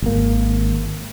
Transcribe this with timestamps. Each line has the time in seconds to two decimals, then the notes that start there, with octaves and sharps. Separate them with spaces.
0.02 G#1 A#3